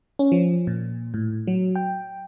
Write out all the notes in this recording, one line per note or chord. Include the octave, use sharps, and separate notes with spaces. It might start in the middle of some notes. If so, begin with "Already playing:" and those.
C#4
F3
A#2
A2
F#3
G5